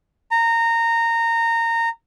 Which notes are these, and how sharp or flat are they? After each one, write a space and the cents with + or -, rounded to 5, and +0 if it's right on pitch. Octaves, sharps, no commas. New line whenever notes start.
A#5 -20